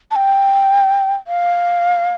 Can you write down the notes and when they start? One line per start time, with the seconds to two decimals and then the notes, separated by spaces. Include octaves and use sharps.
0.11 A5
0.16 G5
1.27 F5